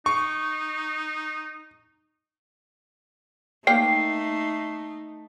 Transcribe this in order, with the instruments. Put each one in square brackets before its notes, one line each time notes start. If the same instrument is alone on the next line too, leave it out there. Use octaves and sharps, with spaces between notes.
[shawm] D#4 [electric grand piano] C#6
[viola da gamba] A3 D#4 [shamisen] A#3 G5 [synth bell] C7